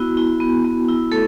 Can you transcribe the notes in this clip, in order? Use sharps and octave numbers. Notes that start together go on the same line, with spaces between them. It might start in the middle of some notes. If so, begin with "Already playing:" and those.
Already playing: B3 E4 F#4
E4
B3
B3
E4
A3 A4